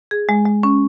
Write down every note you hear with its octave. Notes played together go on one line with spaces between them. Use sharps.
G#4
G#3
G#3
C#4